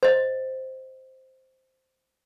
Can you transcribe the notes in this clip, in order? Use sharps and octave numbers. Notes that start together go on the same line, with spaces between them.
C5 D#5